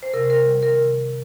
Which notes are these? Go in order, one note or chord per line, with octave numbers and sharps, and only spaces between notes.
C5
C3 A#4
A#4
D#3 G3
A#4
C3